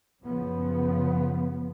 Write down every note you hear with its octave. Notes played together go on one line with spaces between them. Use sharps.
F#2 C#3 F3 B3